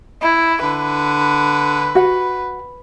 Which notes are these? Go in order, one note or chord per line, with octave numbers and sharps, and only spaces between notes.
E4
D3 B4
F#4 F#5